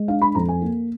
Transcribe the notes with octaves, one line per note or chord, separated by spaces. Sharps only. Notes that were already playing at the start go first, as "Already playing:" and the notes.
Already playing: G#3
D4 F5
B5
F2 A#5
G#5
A#3